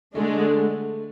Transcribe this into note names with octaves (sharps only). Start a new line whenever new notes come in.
D3 G#3 A3 D4